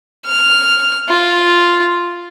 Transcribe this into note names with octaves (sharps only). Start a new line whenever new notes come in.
F6
F4